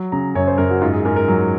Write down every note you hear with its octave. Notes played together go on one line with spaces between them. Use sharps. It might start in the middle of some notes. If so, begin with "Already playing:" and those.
Already playing: F#3
C#3 A#5
F#2 C#5
C5
F#2 A#4
F#4
G#2 F4
G#4
G#2 A#4
A#4
F#3